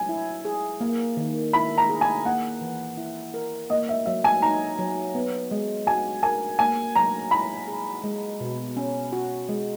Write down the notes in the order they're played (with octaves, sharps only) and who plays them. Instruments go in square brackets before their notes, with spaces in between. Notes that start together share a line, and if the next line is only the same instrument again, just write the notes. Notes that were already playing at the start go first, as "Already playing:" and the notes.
Already playing: [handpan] F#3 [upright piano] G#5
[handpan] E4
G#4
A#3
D#3
[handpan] E4 [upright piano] B5
[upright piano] A#5
[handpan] G#4
[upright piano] G#5
[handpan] A#3 [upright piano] F#5
[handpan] E3
E4
A#4
[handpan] A#3 [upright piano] D#5
[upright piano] E5
[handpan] F#3 [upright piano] E5
[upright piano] G#5
[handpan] D#4 [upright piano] A#5
[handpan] F#3
B3
G#3
[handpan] F#4 [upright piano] G#5
[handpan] A#4 [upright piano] G#5
[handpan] A#3 [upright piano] G#5
[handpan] F#3 [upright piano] A#5
[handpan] E4 [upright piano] B5
[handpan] G#4
G#3
B2
C#4
F#4
G#3